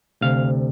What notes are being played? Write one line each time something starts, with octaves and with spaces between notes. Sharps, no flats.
D2 C3 F5